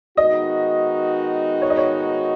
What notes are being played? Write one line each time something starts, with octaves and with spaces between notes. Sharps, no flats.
D#3 G#3 B3 D#4 F#4 D#5
C#5
D#5
C#5